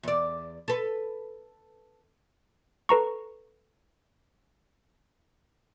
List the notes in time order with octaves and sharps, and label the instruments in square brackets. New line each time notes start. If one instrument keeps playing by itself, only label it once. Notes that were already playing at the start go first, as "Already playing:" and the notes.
[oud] E2 D5
A4 B4
[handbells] A4 B4 A#5 C#6